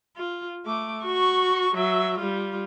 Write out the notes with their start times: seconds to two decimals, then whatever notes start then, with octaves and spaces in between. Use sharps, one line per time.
0.16 F4
0.65 A3 D6
1.04 F#4 C#6
1.75 F#3 E5
2.18 G3 F4